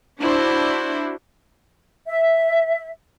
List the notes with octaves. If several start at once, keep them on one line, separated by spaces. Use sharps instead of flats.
D4 E4 F#4 C5
E5